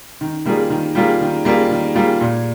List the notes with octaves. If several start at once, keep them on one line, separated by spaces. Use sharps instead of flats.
D#3
G3 A#3 F4 G#4
D#3
G3 A#3 F4 G#4
D#3
G3 A#3 F4 G#4
D#3
G3 A#3 F4 G#4
A#2